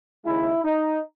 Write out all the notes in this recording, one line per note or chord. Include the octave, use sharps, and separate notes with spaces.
D#2 C#3 G#3 E4
D#4